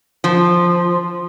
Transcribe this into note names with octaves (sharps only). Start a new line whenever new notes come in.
F3